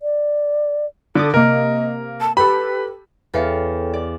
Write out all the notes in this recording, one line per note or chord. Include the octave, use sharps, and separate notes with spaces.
D5
D3 A4 D5 D6 D#6
C3 A#3 A#4 D#5
A5
G4 A4 B4 B5
E2 A4 C#5 F5 G5 C#7
D5